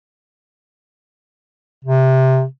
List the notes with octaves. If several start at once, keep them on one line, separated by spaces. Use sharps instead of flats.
C3